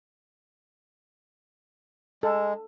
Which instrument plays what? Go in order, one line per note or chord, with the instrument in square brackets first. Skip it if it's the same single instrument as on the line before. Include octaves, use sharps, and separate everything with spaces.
[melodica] G#3 [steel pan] A4